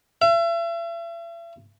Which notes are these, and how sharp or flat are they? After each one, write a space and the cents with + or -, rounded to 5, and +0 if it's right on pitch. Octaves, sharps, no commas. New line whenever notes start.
E5 +40